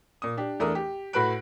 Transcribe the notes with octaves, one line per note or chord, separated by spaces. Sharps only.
A#2 D#6
D4 G4
E2 A3 D4 A#4 D#6
G4
A2 F#4 B4 B5 F#6 D7